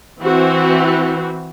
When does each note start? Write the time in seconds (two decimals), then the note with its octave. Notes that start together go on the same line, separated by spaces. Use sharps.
0.21 E3 C4 F#4